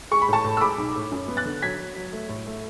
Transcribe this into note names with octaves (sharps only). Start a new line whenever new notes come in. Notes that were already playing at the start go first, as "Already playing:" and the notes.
G#3 C#6
B5
A2 A5 C#6
A2
E6
G#3 B5 D6
B1
A2
F#2
B3
F#6 A6
D3
F#3 G#6 B6
F#3
F#3
A3
A2
A3